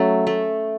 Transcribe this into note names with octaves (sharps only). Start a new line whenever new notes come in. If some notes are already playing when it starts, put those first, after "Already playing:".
Already playing: F#3 A3 C#4
A3